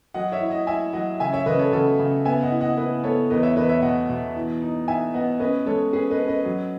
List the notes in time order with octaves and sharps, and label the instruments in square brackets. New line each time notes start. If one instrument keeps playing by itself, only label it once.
[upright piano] F#3 D#5 F#5
C#5 E5
E4
D#5 F#5
E4 E5 G#5
F#3 D#5 F#5
C#3 E5 G#5
C#5 E5
C#3 B4 D#5
A4 C#5
C#3 F#4 A4
C#3
B3 E5 G#5
D#5 F#5
E4
D#5 F#5
E4 B4 D#5
B3 A4 C#5
E2 B4 D#5
C#5 E5
E2 B4 D#5
C#5 E5
B2 D#5 F#5
B2
E3
D#4
D#4 E5 G#5
B3 D#5 F#5
C#4 B4 D#5
G#3 A4 C#5
C#4 G#4 B4
B4 D#5
C#4
B4 D#5
F#3